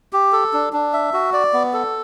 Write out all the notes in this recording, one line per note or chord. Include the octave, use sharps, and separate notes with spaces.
G4
A4
D4
D4
E5
F#4
D5
B3
A4